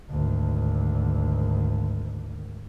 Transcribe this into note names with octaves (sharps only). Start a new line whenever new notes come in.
G#1 D2